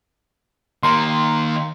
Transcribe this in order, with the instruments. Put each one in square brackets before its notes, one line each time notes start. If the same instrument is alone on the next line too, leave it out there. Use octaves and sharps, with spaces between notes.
[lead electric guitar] D#3 A#3 [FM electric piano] A#5 C6